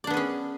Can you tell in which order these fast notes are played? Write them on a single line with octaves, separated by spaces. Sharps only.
D5 D4 B3 G#4 C#4